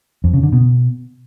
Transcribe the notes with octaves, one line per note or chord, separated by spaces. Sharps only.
F2
C#3
D3
B2